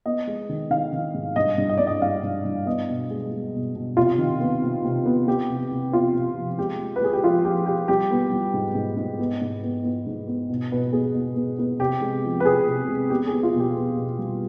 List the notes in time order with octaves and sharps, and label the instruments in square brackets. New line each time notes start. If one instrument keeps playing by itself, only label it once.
[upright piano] B3 D#5
G#3
D#3
D#3 F5
D#3
G#2
G2 D#5
G2
D#5
G2 D5
D#5
G2 F5
G2
G2
B3 D#5
B2
G#3
G#3
B2
B2
C3 F4
D#3
B3
C3
C3
B3
B3 G4
C3
C3
B3 F4
C3
F3
G#3 G4
G#3
B4
G#3 G#4
G4
F3 F4
F3 G4
F3 G4
G3 G4
B3
G3
G#2
G#2
G#2
B3
G#2
B3
B3
G#2
B3
B2
B2 B4
B3 G#4
B2
B3
B3
C3 G4
G#3
F3
B4
C3 G#4
C3
G#3
B3 G4
G#4
B3
F4
B2
G4
B3
B2
G3